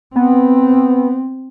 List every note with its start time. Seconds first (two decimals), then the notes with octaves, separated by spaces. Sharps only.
0.16 B3 C4